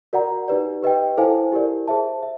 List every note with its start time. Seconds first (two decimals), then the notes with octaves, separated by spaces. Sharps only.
0.13 F#4 A#4 D5 F#5 A#5
0.48 D#4 G4 B4 D5
0.83 G4 B4 D#5 G5
1.17 E4 A4 C5 F5 G#5
1.52 E4 G4 A#4 D5
1.88 G#4 C5 E5 A5
2.23 E5